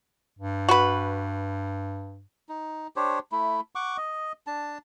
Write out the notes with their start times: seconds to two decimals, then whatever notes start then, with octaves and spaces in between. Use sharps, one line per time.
0.39 G2
0.69 F#4 B4
2.49 D#4
2.96 D4 G4 C5 C#5
3.32 A3 E4
3.75 F#5 C#6 D6
3.97 D#5
4.47 D4 A5